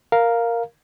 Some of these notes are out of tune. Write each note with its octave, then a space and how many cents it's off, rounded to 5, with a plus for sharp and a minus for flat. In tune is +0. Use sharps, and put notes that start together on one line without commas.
A#4 +0 F5 +0